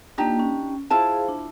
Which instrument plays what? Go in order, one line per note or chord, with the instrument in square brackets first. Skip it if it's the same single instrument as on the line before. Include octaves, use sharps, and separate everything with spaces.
[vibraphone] A#3 F4 [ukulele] D4 D#4 G4
[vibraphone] C#4
[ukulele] E4 F4 A5 [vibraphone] G#4 C5 F5
[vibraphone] D4